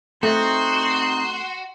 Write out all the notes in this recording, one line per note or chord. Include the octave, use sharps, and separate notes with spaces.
A3 C4 D#4 F#4 C6